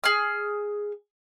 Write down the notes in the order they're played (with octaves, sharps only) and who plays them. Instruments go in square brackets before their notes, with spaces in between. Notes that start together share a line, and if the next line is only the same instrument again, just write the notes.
[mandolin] G#4 F6